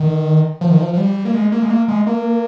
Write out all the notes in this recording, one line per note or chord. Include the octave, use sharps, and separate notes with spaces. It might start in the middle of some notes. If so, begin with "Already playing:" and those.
Already playing: D#3
F3
D#3
F3
F3
G3
A#3
G#3
A#3
G#3
A#3
G#3
A#3